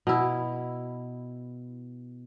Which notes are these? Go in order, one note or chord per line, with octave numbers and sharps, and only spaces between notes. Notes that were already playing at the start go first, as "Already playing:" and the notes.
B2 E4